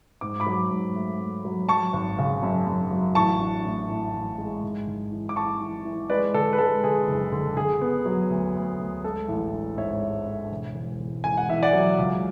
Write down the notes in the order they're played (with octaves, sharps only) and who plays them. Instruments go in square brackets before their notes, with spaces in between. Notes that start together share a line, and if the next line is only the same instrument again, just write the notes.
[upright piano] G#2 D6
B5 D6
F#3
G#2
A3
A3
F#3
F#3 A5 C#6
G#1
C#3
F#2
F#2
F#3
A1 A5 C#6
D4
A2
A2
A1
G#3
G#1
G#1
E3
D6
E3 A5 C#6
E3
E3
G#3 B4 D5
D3 A4
B4
G#3 A4
D3 G#4
F#1
D3
D3 G#4
B3
F#3
D2
D2
D2
G#3 A4
A1
D4
G#2 C#5 E5
G#3
D4
E1
E1
E1
E1 G#5
F#5
E2 E5
D5 F#5
F#3
C#2